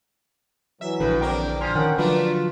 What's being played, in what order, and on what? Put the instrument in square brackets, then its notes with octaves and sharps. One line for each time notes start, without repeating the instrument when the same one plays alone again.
[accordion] E3 F#3 [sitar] E5
[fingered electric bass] A#1 D3 [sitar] A2 [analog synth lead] B4
[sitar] E2 A#3 D4 [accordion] C4 [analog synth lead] G5
[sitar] F3 [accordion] G#5 C6 [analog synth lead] F6
[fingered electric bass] D#3 [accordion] C#4 A#4 G5 [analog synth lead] F#5
[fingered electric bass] D3 F3 F#3 [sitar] A3 A#3 D4 [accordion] F4 [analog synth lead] B4